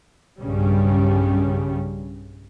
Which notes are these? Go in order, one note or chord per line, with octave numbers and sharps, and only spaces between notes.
B1 G2 C#3 G3 C#4